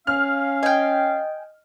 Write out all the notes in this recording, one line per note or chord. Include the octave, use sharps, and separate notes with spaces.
C#4 F5 F6
D#5 G5 G#5